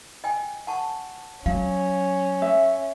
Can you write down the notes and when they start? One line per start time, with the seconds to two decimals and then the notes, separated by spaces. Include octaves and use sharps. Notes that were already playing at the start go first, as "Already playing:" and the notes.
0.24 D#5 G5 G#5
0.67 F#5 A5 C#6
1.46 F#3 C#4 F5
2.42 E5